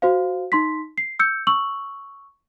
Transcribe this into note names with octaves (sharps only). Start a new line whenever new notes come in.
F#4 C5 F5
D#4 C6 B6
C7
E6 G6 C#7
C#6 E6 F#7